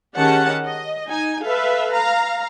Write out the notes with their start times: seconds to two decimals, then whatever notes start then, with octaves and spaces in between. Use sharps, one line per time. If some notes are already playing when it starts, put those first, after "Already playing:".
0.16 D#3 C#4 G4 G#4 F#5 A5
0.65 D#5
1.08 D#4 G#5
1.46 A4 B4 E5 F5
1.94 F5 A#5